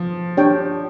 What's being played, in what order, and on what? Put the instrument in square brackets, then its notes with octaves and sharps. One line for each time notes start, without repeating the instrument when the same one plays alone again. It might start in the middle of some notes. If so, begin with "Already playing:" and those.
Already playing: [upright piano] F3
[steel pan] D4 G4 C#5 G5